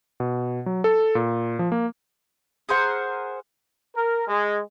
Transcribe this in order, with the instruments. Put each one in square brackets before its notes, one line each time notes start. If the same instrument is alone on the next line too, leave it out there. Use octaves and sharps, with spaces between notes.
[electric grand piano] B2
F#3
A4
A#2
F3
A#3
[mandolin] G#4 A#4 C5 F#5
[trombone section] A#4
G#3